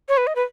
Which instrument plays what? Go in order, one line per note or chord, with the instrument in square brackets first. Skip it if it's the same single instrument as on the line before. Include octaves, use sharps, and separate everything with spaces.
[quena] C#5
B4
D#5
B4